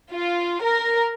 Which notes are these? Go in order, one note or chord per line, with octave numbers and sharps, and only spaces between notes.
F4
A#4